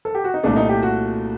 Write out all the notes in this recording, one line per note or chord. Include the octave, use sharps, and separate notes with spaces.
A4
G4
F#4
D#4
C2 A#2 A3 D4
D#4
G4
F#4